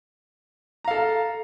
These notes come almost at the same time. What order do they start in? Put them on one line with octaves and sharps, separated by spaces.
A#5 F5 A4